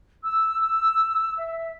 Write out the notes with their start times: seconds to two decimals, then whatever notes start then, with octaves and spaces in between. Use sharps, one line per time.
0.22 E6
0.61 E6
1.36 E5